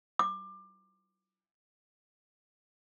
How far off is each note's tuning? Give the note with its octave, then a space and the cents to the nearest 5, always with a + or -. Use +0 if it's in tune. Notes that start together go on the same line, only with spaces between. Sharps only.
D6 +25